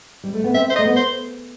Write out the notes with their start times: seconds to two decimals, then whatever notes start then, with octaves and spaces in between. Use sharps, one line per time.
0.24 G3
0.34 A3
0.44 B3
0.54 C4 E5
0.70 C5
0.76 D#5
0.78 A3
0.85 B3
0.96 C5